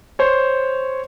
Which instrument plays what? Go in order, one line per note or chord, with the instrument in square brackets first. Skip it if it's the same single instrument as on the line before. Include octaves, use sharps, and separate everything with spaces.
[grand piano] C5 C#5